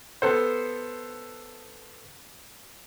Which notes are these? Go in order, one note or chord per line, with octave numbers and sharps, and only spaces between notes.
B3 A4 C5